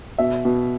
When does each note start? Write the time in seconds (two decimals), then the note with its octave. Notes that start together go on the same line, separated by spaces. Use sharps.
0.18 B2 E5
0.45 B2